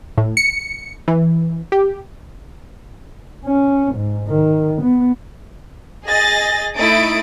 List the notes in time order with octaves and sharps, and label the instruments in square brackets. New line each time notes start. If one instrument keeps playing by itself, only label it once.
[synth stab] A2
C#7
E3
G4
[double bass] C#4
G#2
D#3
B3
[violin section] G#4 D#5 A6 A#6
A3 D#4 E4 D#6 A6 D7